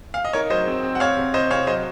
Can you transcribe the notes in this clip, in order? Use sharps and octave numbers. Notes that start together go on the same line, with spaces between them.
F5
D#5
D#4 A#4 C#5
F#3 C5 D#5
C4
C4
F#5
C4 C#5 F5
C3
C3 C5 D#5
C3 C#5 F5
F#3 C5 D#5